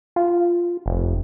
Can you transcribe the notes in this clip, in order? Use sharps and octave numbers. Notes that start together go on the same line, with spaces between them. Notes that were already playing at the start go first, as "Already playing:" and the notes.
F4
F1